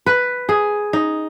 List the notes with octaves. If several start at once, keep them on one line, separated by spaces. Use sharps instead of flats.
B4
G#4
D#4